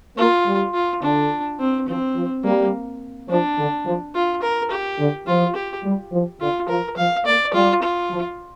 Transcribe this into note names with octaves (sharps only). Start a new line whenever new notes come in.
A#3 F4
G3
F4
D3 D4
C4
F3 C4
F3
G3 A#3
F3 D4
D3
F3
F4
A#4
G4
D3
F3 F4
G4
G3
F3
D3 F4
F3 A#4
F3 F5
A#3 D5
G3 F4
F4
F3